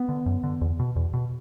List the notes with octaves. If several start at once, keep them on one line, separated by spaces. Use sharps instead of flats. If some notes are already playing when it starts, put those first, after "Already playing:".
Already playing: B3
D3
F#2
D3
E2
B2
E2
B2